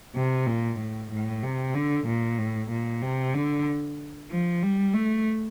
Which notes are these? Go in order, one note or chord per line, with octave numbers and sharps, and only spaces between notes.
C3
A#2
A2
A2
C3
D3
A#2
A2
A#2
C3
D3
F3
G3
A3